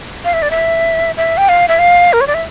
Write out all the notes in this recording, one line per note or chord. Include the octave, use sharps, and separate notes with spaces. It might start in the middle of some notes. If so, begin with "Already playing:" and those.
F5
E5
D5
E5
E5
G5
F5
E5
F5
A#4
C#5
D5
E5